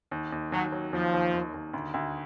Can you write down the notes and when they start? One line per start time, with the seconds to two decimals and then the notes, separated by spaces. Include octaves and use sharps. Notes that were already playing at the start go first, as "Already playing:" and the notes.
0.11 D#2
0.32 D#2
0.52 D#2 F#3
0.72 F#3
0.92 D#2 F3
1.13 D#2
1.34 D#2
1.54 D#2
1.73 D2
1.94 D2